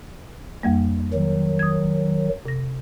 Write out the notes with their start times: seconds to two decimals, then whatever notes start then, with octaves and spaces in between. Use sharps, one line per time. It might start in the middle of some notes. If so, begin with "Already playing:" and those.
0.63 F2 G3 A#3
1.13 D#3 F#3
1.59 D#6 G#6
2.46 C3 A#6